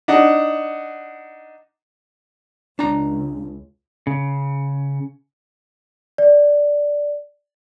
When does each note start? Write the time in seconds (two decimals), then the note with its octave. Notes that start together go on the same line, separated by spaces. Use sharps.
0.08 D4 D#4 F#5
2.79 C#2 D4 A#5
4.07 C#3
6.18 D5